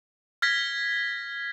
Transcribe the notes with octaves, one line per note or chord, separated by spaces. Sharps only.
F6 G#6 A#6 B6